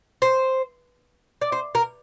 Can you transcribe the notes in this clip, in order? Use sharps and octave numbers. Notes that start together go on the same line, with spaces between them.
C5
D5
C5
A#4